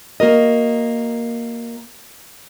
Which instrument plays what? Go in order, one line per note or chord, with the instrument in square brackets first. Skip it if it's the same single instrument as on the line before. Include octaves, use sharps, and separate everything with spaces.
[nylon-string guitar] A#3 F#4 A#4 D#5